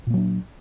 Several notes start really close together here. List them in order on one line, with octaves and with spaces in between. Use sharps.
A#2 A#3 F#3 D4